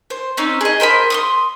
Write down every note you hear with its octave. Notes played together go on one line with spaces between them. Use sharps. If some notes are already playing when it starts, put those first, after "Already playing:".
C5
C4 C#4 D#4
G#4 D#5
A#4 C5 D#5 B5
C6 C#6 D#6